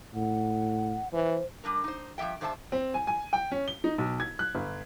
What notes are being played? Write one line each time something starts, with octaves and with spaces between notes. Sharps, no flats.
A2 F#5
E3 C5
G3 D4 A#4
D#4 C5
G2 F3 A#3 E5 G5
G2 G3 C5 E5 G#5 A5
C4
G#5
G#5
G5
C#4
G7
D#4
B1
G#6
F#6
G1